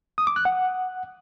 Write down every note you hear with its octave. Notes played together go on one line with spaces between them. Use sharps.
D#6
D6
F#6
F#5